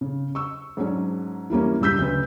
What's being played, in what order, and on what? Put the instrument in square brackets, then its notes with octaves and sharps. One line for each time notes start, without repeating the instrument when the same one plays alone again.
[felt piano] C#3
C#6 E6
G#2 F#3 G#3 C#4 D4
E3 G3 A#3 C#4
C#2 G2 E6 G6 B6
D2 C#3 B4